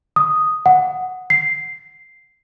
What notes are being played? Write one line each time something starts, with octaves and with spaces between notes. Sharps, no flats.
D#6
F#5
C7